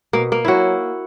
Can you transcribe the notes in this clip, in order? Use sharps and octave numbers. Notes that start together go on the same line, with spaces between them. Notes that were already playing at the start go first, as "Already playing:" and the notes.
B2 A#3
A#3
F#3 E4 F#4